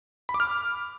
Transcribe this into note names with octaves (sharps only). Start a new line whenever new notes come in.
B5
D6
F6